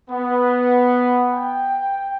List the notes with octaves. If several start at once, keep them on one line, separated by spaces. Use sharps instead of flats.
B3
G5